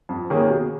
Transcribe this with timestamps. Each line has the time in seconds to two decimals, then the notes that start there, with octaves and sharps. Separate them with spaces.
0.09 F2
0.30 D#3 A#3 C#4 G#4
0.50 B2